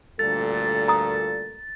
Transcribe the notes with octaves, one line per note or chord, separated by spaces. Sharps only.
D2 G2 A#2 A4 A6
A#5 D#6